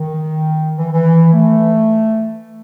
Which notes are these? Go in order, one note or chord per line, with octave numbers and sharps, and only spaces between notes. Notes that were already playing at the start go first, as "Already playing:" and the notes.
Already playing: D#3
E3
E3
A3